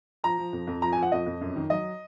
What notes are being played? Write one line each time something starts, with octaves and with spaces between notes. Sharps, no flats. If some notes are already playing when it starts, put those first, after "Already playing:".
F3 A#5
F3
F2
F2
F3 A#5
G#5
F3 F#5
F2 D#5
F2
F#2
D#3
F#3 D#5